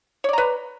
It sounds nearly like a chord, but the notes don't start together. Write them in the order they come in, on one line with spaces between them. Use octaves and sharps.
C#5 D5 A#5 B4